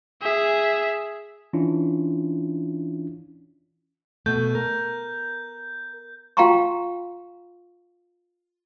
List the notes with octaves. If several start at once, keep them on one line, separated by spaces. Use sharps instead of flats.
G#4 E5
E3 C#4 D4 E4 F4
B2 A3 G6
A#4
F4 F5 G5 A#5 C6 C#6